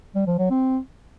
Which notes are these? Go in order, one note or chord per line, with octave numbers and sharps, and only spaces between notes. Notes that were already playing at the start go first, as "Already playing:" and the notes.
G3
F3
F#3
C4